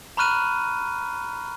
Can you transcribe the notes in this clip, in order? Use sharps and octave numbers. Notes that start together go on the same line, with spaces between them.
A#5 B5 C#6 F6 F#6 D#7